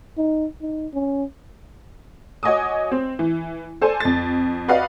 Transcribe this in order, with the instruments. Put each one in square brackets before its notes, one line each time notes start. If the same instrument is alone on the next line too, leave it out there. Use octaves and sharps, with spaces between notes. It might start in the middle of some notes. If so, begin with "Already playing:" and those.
[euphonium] D#4
D#4
C#4
[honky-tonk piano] F#4 C#5 D#5 G#5 D6 D#6
C4
E3
A4 C5 D5 G#5
F2 A6
F#4 B4 D5 D#5 F5 F#5